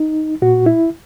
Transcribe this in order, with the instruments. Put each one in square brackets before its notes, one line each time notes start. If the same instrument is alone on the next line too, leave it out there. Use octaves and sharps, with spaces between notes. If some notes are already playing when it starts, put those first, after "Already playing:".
Already playing: [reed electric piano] D#4
A#2 F#4
E4